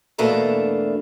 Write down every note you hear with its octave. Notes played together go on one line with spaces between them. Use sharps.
E2 B2 A3 A#3 D4 A#5